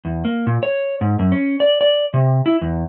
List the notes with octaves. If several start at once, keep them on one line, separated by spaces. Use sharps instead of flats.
E2
A#3
A#2
C#5
G#2
F#2
C#4
D5
D5
C3
E4
E2